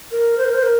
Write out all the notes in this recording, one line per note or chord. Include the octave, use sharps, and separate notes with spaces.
A#4
C5
A#4
C5
A#4